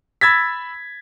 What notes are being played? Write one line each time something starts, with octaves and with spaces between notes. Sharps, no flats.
B5 E6 G#6 A6 B6